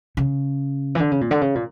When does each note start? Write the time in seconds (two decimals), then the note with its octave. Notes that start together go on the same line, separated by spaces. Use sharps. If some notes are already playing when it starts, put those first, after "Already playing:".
0.17 C#3
0.95 E3
1.00 D3
1.11 C#3
1.21 A#2
1.31 D3
1.41 C#3
1.55 A#2